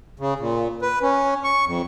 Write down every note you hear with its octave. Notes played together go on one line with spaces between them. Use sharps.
C#3
A#2
B4
C#4
C#6
F2